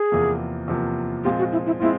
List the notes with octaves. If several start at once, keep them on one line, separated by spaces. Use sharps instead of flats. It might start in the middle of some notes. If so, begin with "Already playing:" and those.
Already playing: G#4
E2 C3 F3 A#3
E2 C3 F3 A#3
A#2 F3 G#3 C4 F4 G4
F#4
E4
E4
G#3 C4 E4 F4